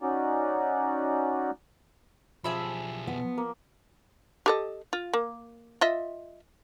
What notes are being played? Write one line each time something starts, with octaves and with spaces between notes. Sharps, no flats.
C#4 D#4 F#4 D5
B1 F3 G4 G#4 E5 B5
B3
A#3
G4 A4 D#5
F4
A#3
F4 D#5 E5